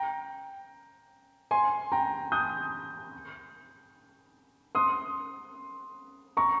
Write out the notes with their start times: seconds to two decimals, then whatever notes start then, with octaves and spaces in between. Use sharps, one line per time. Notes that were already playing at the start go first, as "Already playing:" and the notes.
Already playing: G5 A#5
1.51 G#5 C6
1.92 G5 A#5
2.32 D#6 G6
4.75 C6 D#6
6.37 A#5 C#6